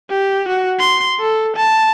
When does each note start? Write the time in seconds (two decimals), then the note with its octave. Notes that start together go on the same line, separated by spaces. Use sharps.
0.10 G4
0.48 F#4
0.79 C6
1.20 A4
1.56 A5